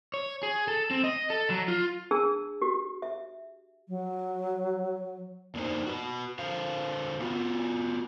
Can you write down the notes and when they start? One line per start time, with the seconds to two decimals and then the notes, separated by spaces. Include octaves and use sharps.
0.14 C#5
0.43 G#4
0.68 A4
0.91 C4
1.04 D#5
1.30 A4
1.50 F#3
1.68 F4
2.11 D4 G#4 A5 E6
2.62 F#4 G4
3.02 E5
3.88 F#3
5.55 F#2 A#3 D4 D#4 C5
5.87 F#4 B4
6.39 D3 C5 F5
7.21 B3 F4 F#4